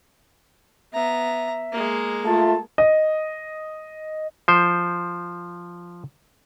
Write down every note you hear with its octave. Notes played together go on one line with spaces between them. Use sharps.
B3 E5 A#5
G#3 A#3
A3 F4 A5
D#5
F3 C5